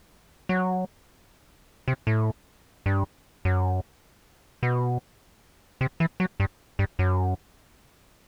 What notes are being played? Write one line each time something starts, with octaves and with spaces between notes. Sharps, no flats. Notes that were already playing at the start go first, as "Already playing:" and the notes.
F#3
C3
A2
G2
F#2
B2
C3
E3
F#3
G2
G2
F#2